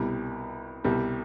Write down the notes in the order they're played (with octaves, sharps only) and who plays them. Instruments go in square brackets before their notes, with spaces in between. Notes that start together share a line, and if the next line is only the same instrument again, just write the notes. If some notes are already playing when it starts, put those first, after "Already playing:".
Already playing: [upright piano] C2 B2 G3
C2 B2 G3